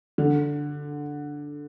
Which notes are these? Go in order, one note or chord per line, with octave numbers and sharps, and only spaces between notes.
D3